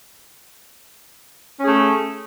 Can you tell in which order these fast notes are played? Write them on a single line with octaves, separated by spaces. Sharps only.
C#4 G#4 A3